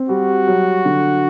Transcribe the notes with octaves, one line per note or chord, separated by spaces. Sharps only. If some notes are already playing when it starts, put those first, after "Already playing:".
Already playing: C4
G3 F#4
F#3
D3